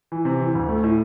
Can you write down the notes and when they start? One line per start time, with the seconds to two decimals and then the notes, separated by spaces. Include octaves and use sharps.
0.12 E3
0.25 C3
0.40 E3
0.55 D2
0.69 A3
0.84 A2